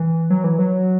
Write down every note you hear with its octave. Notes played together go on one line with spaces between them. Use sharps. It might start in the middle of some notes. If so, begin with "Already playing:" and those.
Already playing: E3
F#3
E3
F#3